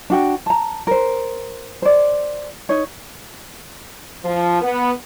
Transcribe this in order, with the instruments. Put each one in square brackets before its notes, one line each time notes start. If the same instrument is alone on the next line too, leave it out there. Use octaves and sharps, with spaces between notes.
[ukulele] D4 F#4 G5
A5 A#5
A#4 C5
C5 D5
D#4 C#5
[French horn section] F3
B3